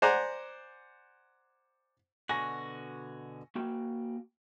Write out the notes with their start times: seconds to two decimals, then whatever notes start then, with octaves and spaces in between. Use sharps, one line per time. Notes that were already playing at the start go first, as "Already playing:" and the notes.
0.02 C5 D5 F#5 G#5 A#5
2.29 B2 D3 F#4 G#5 C#6 A#6
3.55 A#3 F#4 G5